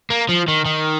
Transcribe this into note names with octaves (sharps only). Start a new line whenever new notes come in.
A#3
F3
D#3
D#3